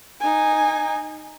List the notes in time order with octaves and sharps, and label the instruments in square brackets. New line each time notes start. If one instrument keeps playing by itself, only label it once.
[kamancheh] D#4 G#5